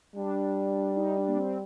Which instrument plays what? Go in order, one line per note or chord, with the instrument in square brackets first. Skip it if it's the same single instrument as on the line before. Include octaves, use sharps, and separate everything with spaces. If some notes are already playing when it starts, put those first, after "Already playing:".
[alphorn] G3 [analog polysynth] D4
[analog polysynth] D#4
D4
A#3
C4